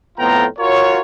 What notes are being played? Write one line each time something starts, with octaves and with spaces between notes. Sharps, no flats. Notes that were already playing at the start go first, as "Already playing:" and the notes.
F2 A2 B3 F4 G5 A#5
F4 F#4 A#4 C#5